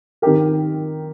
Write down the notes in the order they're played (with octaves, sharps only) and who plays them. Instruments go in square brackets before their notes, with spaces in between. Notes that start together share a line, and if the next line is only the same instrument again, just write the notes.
[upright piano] D#3 C4 G4 A#4